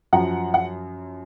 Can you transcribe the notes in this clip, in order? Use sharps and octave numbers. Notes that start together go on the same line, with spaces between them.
F#2 F3 F#5 A#5
F#5